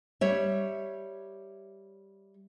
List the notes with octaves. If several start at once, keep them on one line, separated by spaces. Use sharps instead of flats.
G3 C#5 E5